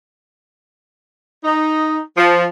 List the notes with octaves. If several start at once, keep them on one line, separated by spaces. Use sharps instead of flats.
D#4
F3